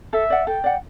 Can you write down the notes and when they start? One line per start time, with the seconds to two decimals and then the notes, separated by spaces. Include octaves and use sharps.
0.13 A4 E5
0.30 D5 F#5
0.47 A4 G5
0.64 D5 F#5